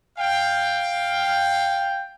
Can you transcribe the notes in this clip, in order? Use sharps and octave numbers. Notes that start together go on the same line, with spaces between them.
F5 G5